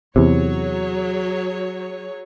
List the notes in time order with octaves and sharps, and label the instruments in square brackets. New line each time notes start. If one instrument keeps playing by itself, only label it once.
[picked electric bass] E2 C3 [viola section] F#3 G#4 C#5